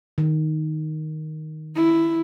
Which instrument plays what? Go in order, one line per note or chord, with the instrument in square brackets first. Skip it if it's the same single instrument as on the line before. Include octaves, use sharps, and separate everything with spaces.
[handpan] D#3
[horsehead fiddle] E4